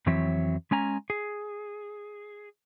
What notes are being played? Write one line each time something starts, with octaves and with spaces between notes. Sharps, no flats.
F2 E3 F#3 C4 C#5 E5
G#3 C#4 G#5 A#5
G#4